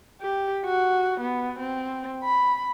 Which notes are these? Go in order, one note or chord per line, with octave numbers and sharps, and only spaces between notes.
G4
F#4
B3
C4
B5